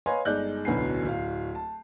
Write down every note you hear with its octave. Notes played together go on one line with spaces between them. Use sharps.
B4 C#5 D#5 F5 G#5 C6
G1 G#3 D#4 D5 F#6 G6
D1 B1 D3 B4 G#5 C7
D1 F5
A5